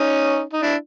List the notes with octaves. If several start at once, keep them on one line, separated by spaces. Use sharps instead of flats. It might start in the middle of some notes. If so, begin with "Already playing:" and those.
Already playing: C#4 D#4
D#4
D4 E4